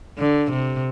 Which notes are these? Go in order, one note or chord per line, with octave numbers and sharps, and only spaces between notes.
D3
C3